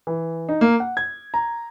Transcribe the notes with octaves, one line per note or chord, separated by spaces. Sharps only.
E3
D#4
A#3
F#5
G#6
A#5